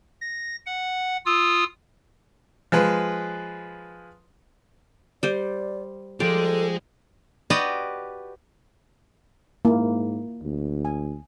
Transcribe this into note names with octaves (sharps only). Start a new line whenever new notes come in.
A#6
F#5
F4 D#6 E6
F3 G#3 B4
G3 C5 D5
F3 G#3 G4 A4 D5
F#4 G4 B4 D5 D#5
G#2 A#3 E4
D2
G#5